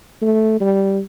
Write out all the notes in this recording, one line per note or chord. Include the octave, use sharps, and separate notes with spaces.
A3
G3